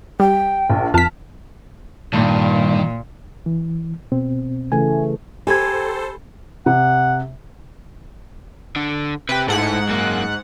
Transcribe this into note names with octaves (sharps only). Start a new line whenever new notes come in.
G3 G5
A#1
F2 A5 F6 B6
G2 A#2 D#3
E3
B2 C4
C#3 E3 A3 G#5
G4 A4 C5 G#5 B5 G#6
C3 F#5
D3 D4
C3 G4 B4
G#2 E4 A4 F#5
F#2 A#3